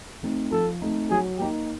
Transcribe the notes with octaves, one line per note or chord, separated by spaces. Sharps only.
A3 C4 D#4
F3 A4
A3 C4 D#4
F#3 G#4
A#3 D#4 G4